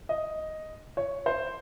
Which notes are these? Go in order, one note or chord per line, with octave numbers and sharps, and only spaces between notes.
D#5
C#5
C5